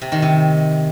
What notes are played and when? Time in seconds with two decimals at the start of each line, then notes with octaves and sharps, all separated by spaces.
0.02 C3
0.12 D#3
0.22 C3